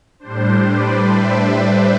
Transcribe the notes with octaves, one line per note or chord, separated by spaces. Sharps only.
A2 G3 D4 C5
B4 D5
C5 E5